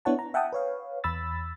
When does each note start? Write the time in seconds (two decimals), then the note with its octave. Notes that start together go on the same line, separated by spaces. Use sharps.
0.05 B3 D4 E4 C#5 F#5 A5
0.19 A#5
0.34 E5 F#5 G5 A5 D#6
0.52 B4 C#5 F5
1.04 E2 B5 E6 A6